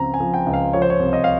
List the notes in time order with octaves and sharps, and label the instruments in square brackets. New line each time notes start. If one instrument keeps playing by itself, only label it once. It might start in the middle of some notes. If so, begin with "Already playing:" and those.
Already playing: [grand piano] C#2 C#3 F3 C4 A#5
G#5
F3
G5
C#2
F5
F3 C#5
C5
C#5
C2
D#5
F5